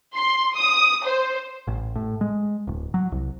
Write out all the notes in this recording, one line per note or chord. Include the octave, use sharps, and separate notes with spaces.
C6
D#6
C5
A1
A2
G#3
D1
F#3
C2